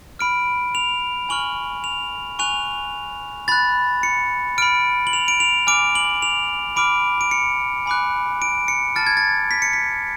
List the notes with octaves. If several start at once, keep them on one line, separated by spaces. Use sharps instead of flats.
B5 F6 D7
F7
G#5 C#6 F6 F#7
F7
G#5 C#6 F#6 F7
B5 F#6 A6
C#7
B5 F6 D7
F#7
F7
D7
F7
G#5 D6 F6 D7
F#7
F7
B5 D6 F6 D7
D7
C#7
G#5 B5 D6 F#6
D7
C#7
A5 F6 A6
G#6
A6
B6
C#7
B6